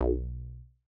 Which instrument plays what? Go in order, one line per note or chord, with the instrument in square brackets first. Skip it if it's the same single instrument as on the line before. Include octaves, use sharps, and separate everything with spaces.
[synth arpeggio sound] B1